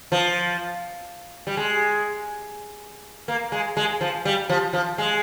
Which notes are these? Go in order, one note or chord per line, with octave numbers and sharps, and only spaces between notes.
F3
G3
G#3
A#3
G#3
G#3
F3
G3
F3
F3
G#3